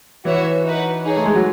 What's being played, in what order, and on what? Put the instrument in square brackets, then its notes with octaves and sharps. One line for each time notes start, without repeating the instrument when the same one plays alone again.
[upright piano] E3 [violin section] F#4 C#5 E5
[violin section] D#4 F#4 B4
D#4 G#4 C#5
[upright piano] A3
G#3
F#3